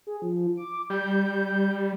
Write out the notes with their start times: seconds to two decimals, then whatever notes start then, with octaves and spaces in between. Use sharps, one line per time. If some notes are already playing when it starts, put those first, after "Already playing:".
0.07 G#4
0.22 F3
0.57 D6
0.90 G3 G6